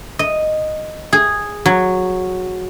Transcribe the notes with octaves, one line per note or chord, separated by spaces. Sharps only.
D#5
G#4
F#3